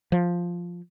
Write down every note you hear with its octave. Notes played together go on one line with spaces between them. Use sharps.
F3